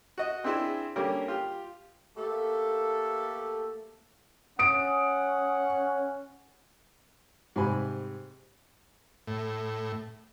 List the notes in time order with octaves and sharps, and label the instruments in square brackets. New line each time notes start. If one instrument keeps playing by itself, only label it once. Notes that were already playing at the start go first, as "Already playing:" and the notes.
[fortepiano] F#4 D#5
C4 D4 E4 G#4 C5
D3 G3 A#3 C#4 G4 A#4
F4 G4
[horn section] A3 A#3 G4 A4
[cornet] C#4 [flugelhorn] F#5 [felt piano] D#6 D7
[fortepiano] G#2 C3 G3 C4 G#5 B5
[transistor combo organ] A2